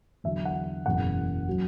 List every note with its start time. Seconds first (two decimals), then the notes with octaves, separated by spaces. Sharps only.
0.24 E2 D3 F#3 E5
0.45 F#5
0.86 F#1 E2 B2 F#3 F#5
1.49 F#3